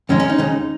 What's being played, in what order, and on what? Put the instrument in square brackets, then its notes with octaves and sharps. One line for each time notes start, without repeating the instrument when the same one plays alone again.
[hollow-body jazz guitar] F2 D#3 G#3 C#4
C#4
D#4
D#2 C#3 G#3 C#4